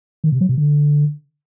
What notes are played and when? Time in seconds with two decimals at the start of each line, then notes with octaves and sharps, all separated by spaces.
0.24 D#3
0.32 C3
0.41 F#3
0.49 C3
0.57 D3